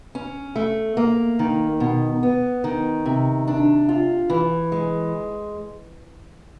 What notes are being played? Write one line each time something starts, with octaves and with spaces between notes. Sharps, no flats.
C#4
A3
A#3
D#3
B2
B3
D#3
C3
D4
F4
E3
G#3